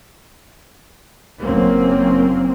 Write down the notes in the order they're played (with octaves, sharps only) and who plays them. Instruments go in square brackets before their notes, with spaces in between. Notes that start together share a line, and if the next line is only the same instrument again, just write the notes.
[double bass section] F#1 F#3 A#3 C4 C#4